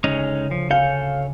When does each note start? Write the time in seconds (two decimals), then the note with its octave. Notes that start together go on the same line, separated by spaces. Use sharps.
0.04 D2 C#3 G#3 C#4 D#4
0.51 F3
0.71 F#4 A4 B4 C#5 F5 G#5 G6